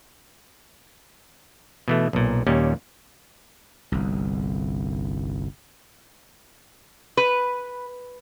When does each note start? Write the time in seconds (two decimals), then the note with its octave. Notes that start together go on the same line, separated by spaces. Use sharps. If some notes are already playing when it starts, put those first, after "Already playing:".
1.88 B2 E3 A3
2.13 B1 A#2
2.47 D#2 A#2 G3 C#4
3.92 G1 C2
7.17 B4